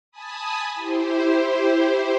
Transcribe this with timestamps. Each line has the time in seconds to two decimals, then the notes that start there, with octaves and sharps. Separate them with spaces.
0.11 G#5 A5 B5 D#6
0.75 E4 G4 C5